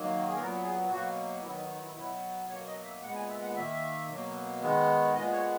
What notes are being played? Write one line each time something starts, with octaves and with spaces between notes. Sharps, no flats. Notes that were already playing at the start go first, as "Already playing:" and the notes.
Already playing: D#3 F#3 A#3
G#4
A#2 F#3 B3 A#4
G#4
B2 F#3 A#3 F#4
D#3 F#3 B3 E4
D#4
D#4
E4
B2 F#3 B3 E4
B2 F#3 A#3 C#5
D#5
E5
A#2 G#3 B3 F#5
G#5
E5
F#5
D#3 A#3 E5
B2 F#3 A#3
D#3 G#3 B3
A#2 G#3 B3 D#5
C#5